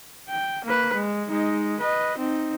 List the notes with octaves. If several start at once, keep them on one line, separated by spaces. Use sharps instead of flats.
G5
A#3 B4
G#3
G#3 D#4
B4 D#5
C4 D#4